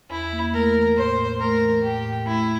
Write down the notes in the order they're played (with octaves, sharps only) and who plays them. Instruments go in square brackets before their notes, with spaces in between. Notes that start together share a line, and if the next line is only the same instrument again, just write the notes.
[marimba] E2 [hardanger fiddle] E4
[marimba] A#3
[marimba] A3 [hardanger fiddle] A#4
[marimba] E3
[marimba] A2 [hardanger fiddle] C5
[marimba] A2
[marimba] A3 [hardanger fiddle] A#4
[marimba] E3
[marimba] A2 [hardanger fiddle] G4
[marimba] A2
[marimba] A3 [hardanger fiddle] E4